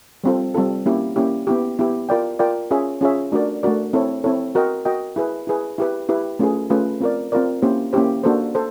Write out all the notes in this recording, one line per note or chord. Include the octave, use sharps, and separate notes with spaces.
G3 C4 F4 A4
G3 C4 F4 A4
A#3 C#4 E4 G4
A#3 C#4 E4 G4
B3 E4 G4
B3 E4 G4
F4 A#4 D5 G5
F4 A#4 D5 G5
C#4 F4 G#4 C#5 E5
C#4 F4 G#4 C#5 E5
A3 D4 F#4 A#4 D5
A3 D4 F#4 A#4 D5
C4 E4 A4 C#5
C4 E4 A4 C#5
F#4 A#4 D#5 G5
F#4 A#4 D#5 G5
E4 G#4 B4
E4 G#4 B4
E4 G4 B4
E4 G4 B4
A3 C#4 F4 G#4 B4
A3 C#4 F4 G#4 B4
C4 F4 A#4 D5
C4 F4 A#4 D5
A#3 C#4 E4 G4 C5
A#3 C#4 E4 G4 C5
A#3 D4 F#4 A4 C5
A4 C5